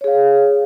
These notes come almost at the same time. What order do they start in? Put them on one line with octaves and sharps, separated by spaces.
C#5 G#4 F5